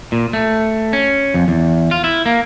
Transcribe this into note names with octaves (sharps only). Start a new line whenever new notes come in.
A#2
A3
C#4
F2
E2
F4
E4
A#3